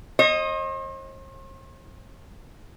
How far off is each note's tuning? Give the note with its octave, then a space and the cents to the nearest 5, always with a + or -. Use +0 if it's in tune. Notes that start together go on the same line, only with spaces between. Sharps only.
C5 +45 D#5 +0